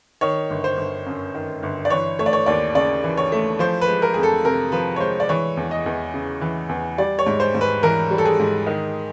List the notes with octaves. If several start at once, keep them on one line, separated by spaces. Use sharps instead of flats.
D#3 C#5
G1
C5
G1
F#2
D#3
G1
D5
E3 C#5
A3 C#5
D5
C#5
D#2 D5
C#3 D5
E3
C#5
A3
F3 C5
B4
G#3
A#4
F2 G#4
A4
C3 A#4
F3 B4
C#5
G#3 C5
D5
E3 C#5
E2
D#5
E2
C#3
E3
E2
G3 D5
C#5
G#2
C5
G#2
B4
E3 A#4
G3
A4
G#4
G#2
D#3